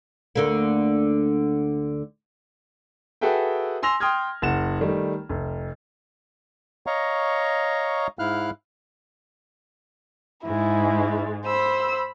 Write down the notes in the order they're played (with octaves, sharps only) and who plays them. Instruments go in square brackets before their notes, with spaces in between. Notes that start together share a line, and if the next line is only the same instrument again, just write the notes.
[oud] D2 D3 A#3
[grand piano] F#4 G#4 A4 B4 E5 G5
G#5 C6 E6 A#6 F7
G5 C6 D#6 F6 G#6
F#1 F#5 E7
D#3 G3 A3
F1
[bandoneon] C#5 D#5 F5 A#5 C#6
G#2 E4 F5 F6 F#6
[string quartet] G#2 G#3 [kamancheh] E4
[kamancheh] C5 [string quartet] B5 E6